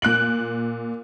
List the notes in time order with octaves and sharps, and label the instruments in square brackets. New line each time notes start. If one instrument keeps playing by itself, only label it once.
[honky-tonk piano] A#2 F#6 D7 F#7